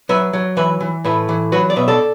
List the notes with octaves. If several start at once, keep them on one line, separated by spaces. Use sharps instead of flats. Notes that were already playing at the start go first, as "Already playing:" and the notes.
F#3 B4 E5
F#3
E3 B4 E5
E3
A2 B4 E5
E3
F#3 F#4 B4
D5
B2 B4 E5
A4 D5